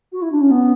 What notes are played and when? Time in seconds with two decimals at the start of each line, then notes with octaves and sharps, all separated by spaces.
0.12 F#4
0.22 E4
0.32 D4
0.41 C#4
0.51 B3